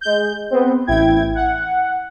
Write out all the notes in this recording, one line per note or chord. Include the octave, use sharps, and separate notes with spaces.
G#3 G6
B3 C4
A1 E4 G5 G#6
F#5